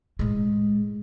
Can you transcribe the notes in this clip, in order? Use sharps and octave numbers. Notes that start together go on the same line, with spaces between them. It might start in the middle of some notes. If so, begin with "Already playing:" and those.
A2 G#3